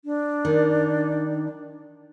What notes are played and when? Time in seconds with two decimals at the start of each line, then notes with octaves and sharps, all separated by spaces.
0.05 D4
0.45 D#3